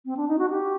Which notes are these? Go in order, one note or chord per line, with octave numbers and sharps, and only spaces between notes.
C4
D4
D#4
F#4
G4